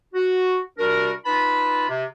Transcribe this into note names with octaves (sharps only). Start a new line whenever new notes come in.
F#4
C3 G3 D4 F#4 A#4
D#4 F4 B4 A5 B5
C3